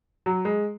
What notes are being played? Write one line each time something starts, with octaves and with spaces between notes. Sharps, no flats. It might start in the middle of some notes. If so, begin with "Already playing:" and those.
F#3
G#3